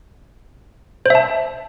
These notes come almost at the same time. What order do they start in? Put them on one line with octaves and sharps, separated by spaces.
C5 E5 A5